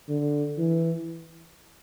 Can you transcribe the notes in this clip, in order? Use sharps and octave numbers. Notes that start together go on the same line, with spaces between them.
D3
E3